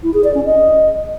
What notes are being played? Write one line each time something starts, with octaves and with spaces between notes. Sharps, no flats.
E4
G#4
D5
C#4
D#5